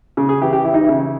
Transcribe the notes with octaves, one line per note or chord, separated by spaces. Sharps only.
C#3
G#4
E3 G4
G4
E3 E4
D#4
C#3 E4